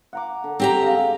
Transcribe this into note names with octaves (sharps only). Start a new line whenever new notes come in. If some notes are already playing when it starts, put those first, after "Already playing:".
F#5 A#5 D6
D3
C4 G4 A#5
G#3 F5